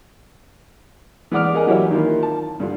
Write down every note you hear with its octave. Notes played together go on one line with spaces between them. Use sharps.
E3 G#3 D5 F#5 D6 F6
G#4 A#4 D#5 F#5 G#5
E3 F#3 E4 G4 C#5 E5
D#3 A#3 E4 F4
A5
G2 D3 F4